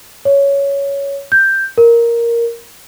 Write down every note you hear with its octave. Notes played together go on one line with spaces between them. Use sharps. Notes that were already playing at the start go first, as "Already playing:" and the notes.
C#5
G6
A#4